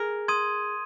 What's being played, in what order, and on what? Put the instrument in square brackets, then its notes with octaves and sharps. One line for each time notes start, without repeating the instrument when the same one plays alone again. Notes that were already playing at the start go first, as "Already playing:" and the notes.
Already playing: [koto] G#4 A#4
[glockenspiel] C6 D#6 G#6 D#7